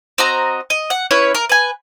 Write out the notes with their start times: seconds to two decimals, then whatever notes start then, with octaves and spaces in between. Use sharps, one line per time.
0.18 C4 F#4 D#5 A#5
0.70 D#5
0.90 F#5
1.11 C#4 E4 B4 C#5
1.35 A#4
1.49 B4 G#5